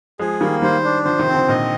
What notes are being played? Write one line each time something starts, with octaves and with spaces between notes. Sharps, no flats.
F3 G#3 G#4
D#3 G3 A#3
D#3 G3 C5
D4
D3 F3 C5
C3 D#3
C4
D3 F3
A#2 D3 D#5